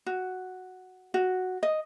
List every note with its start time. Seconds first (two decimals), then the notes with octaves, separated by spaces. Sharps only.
0.06 F#4
1.14 F#4
1.63 D#5